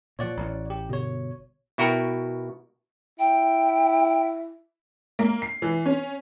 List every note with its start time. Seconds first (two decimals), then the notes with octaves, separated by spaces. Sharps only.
0.19 A#2 F3 C#5 D5 F#5
0.37 A1
0.70 G4
0.89 G1 B2 C#5
1.78 B2 E4 F#4 A#4 G5
3.19 E4 G5
5.19 A#3
5.42 C7
5.62 E3
5.86 C#4